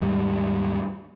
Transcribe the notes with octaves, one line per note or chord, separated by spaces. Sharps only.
D#2 G#2 G3